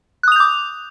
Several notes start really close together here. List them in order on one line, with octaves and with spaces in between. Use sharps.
F#6 D#6 F7 G6 D6